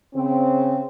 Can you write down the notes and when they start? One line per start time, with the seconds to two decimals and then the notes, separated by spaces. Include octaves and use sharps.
0.15 C#3 C4